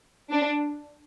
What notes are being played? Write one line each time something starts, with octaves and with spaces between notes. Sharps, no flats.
D4